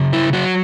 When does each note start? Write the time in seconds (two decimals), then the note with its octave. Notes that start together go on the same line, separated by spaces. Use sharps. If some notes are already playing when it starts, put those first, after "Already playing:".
Already playing: C#3 F#3
0.13 E4
0.33 F#3 F#4